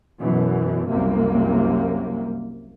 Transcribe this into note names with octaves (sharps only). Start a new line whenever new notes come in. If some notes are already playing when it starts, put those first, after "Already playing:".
F#2 B2 E3
C2 F#2 C3 A#3